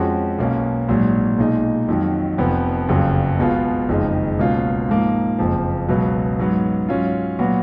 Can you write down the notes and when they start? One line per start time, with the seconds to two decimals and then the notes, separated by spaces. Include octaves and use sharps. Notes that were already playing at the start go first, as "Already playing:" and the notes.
Already playing: F2 F3 G#3 C#4 F#4
0.38 B1 B2 A#3 C#4
0.88 A#1 G#2 F#3
1.38 B1 A#2 G#3 D#4
1.88 F2 D#3 F#3
2.38 F1 F2 F3 B3
2.88 F#1 F2 C#3 F#3
3.39 B1 B2 G#3 B3 F4
3.89 F#1 F2 D#3 G#3 D#4
4.39 C#2 B2 A#3 C#4 F4
4.89 G#2 F3 A#3
5.38 F#1 F2 F3
5.89 C#2 B2 F#3 B3
6.39 G#2 F#3 B3
6.89 G#2 F#3 C#4 F4
7.39 A#2 F#3 B3 F#4